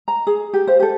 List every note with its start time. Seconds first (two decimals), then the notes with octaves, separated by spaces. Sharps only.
0.08 A#5
0.27 G#4
0.53 G4
0.67 C5 F5
0.80 G4 A4